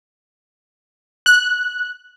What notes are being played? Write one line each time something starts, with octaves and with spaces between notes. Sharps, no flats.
F#6